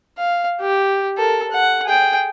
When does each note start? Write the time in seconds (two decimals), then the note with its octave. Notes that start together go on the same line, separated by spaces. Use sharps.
0.18 F5
0.61 G4
1.18 A4 A#4
1.51 F#5
1.85 G#4 G5